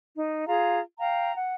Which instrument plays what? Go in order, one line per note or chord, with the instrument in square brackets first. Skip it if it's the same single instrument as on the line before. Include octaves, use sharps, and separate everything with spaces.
[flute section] D#4
F4 G#4 A#5
F5 G5 A#5
F#5